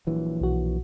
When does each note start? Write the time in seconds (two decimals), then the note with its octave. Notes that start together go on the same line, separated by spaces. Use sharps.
0.07 A#1 E3 F#3
0.41 B1 F#4